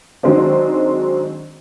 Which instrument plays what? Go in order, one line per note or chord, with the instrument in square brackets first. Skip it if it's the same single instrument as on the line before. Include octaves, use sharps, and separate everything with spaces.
[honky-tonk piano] D#3 F#3 G#3 C4 D4